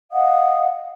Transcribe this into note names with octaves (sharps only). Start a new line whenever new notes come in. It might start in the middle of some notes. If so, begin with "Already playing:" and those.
D#5 F5 F#5 D#6